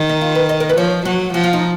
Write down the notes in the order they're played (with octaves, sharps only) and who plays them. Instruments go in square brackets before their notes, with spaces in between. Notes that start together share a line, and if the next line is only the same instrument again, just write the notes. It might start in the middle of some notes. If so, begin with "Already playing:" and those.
Already playing: [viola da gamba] D#3
[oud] D#4
F4
B4
D#5
A#4
B4
[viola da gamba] F3 [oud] C#5
[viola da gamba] F#3 [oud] F#4
[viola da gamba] F3 [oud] F#4
[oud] F4
D#4